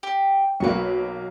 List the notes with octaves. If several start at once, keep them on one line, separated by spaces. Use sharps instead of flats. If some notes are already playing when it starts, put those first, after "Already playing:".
G4
B1 F#3 A#3 B4 C#6